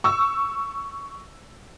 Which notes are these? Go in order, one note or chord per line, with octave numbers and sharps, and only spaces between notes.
C#6 E6